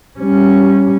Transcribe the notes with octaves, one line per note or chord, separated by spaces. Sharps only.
G3 C#4